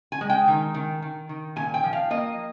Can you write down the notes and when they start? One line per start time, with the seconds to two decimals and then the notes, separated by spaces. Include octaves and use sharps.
0.12 G#5
0.21 G#3
0.30 G5
0.48 D#3
0.74 D#3
1.02 D#3
1.29 D#3
1.56 A#2 G#5
1.74 G5
1.84 F3
1.93 F5
2.10 A#3 D#5